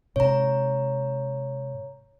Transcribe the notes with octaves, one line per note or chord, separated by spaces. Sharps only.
G#2 C3 C#5 A#5